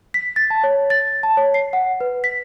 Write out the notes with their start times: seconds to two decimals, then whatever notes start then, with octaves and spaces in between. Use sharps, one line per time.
0.14 B6
0.36 A6
0.50 A5
0.64 C#5
0.90 A6
1.23 A5
1.37 C#5
1.54 C7
1.73 F#5
2.01 B4
2.24 B6